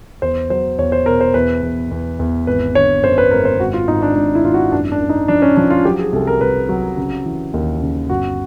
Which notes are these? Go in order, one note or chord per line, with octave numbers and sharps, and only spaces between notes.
E2 C5
F#3 C5
E2 C#5
C5
B2 A#4
C5
E2 B4
E2
E2
E2
G#1 B4
D3 C#5
F#2 C5
B4
G#1 A#4
C5
G#1 F#4
F4
G#1 D#4
D4
G#1 D4
E4
G#1 F4
F#4
F#2 D4
D4
F#2
D#4
F3 D4
C#4
F3 D4
F4
F#3 G4
G#4
C2 A4
A#4
C2 B4
F#3
C#3
E3
D#2
C#3
G1 F#4